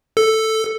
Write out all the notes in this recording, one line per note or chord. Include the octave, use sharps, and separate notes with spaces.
A4